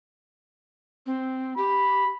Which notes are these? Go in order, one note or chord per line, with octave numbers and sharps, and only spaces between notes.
C4
G4 B5